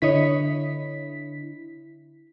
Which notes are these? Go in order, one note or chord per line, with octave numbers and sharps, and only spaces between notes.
D3 E4 B4 C#5 D#5 B6